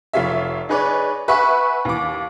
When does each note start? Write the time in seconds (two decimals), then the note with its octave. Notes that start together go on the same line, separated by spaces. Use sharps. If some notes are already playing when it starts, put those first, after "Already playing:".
0.13 F1 F4 C#5 E5
0.69 D#4 G#4 B4 C#5 D5
1.28 B4 E5 F#5 G#5 B5 C#6
1.85 D#2 E3 D6